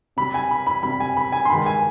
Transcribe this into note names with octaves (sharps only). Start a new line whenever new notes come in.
C3 G3 B5
G#5
B5
B5
C3 G3 B5
G#5
B5
G#5
C6
G2 D#3 G#3 B5
G#5